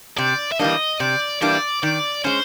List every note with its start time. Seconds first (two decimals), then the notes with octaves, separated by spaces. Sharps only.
0.18 C3 D5
0.52 E5
0.59 E3 G3 A#3 D4 D#5
1.00 C3 D5
1.42 E3 G3 A#3 D4 D5
1.83 D#3 D5
2.24 G#3 C#4 C5